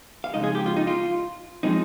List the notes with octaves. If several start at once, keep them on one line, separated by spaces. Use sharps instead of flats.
F5
F2 C#3 G#3 D#4 D#5
G#4
G4
F4
D#4
F4
F3 G#3 C4 D#4